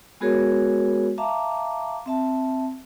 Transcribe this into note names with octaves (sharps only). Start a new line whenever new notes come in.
G#3 B3 F#4 G#4 A#4 C#5
E5 F5 A5 A#5 D6
C4 E5 A5